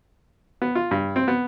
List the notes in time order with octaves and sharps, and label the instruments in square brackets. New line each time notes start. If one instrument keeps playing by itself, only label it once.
[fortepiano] B3
F4
G2
C4
B3